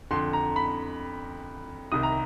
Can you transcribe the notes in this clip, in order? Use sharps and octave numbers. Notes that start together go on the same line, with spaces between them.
F2 D3 C6
A#5
B5
C2 C3 D#3 D#6
A#5